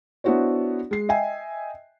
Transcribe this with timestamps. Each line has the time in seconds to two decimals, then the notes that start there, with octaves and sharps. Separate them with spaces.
0.24 B3 D4 E4 F#4 C5 C#5
0.91 G#3 C7
1.09 D#5 E5 G5 G#5